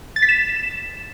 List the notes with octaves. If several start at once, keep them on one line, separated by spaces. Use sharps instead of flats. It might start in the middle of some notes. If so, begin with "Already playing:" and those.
A6
B6
E7